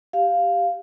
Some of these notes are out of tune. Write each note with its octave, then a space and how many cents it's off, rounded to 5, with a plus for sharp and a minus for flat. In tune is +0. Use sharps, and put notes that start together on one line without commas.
G4 +0 F5 +0